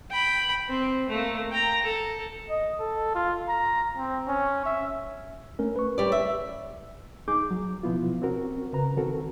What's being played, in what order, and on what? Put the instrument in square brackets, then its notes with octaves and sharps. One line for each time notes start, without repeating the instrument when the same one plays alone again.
[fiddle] G5 B5
C4
A3 A#3
G5 A#5
A4
[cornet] D#5
A4
F4
A#5
C4
C#4
E5
[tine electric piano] A3 C#4 A#4
B4 C#6
[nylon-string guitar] G3 D5
E5
[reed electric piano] D#4 G#4 D6 G6
F#3
B2 F3 B3 E4 F4
C4 C#4 F#4 A#4
C#3 B4 A#5
D#3 C4 F#4 A4 A#4